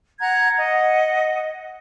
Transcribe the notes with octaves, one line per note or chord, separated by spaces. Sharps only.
F#5 A#5 F#6 G#6
D#5 F#5